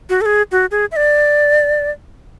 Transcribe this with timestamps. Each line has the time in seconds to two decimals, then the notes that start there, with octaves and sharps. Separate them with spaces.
0.10 F#4
0.21 A4
0.26 G#4
0.52 F#4
0.71 G#4
0.92 E5
0.96 D5